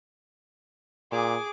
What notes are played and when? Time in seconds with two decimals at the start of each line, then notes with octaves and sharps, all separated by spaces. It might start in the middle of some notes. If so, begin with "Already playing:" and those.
1.12 A#2 G#4 D6